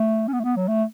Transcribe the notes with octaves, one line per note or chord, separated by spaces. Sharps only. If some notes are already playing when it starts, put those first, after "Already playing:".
Already playing: A3
C#4
B3
A3
B3
F#3
A3